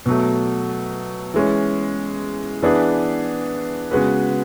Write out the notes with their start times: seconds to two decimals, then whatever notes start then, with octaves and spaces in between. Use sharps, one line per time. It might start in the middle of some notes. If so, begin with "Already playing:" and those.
0.06 B2 F#3 A3
1.34 E3 G#3 C#4
2.62 E3 B3 D4 G#4 B4
3.91 C#3 G#3 B3 F#4 B4